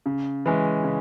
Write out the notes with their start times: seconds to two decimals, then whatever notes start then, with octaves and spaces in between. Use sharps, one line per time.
0.06 C#3
0.46 E3 G#3 C#4
0.84 C#3